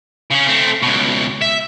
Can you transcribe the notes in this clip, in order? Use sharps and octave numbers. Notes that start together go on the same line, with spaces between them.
C#3 C#4
A3 C4
C#2 B2
E5